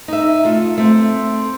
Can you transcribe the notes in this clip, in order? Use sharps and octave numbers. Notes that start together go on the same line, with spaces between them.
D#4 E5
A3 F4
A3 C4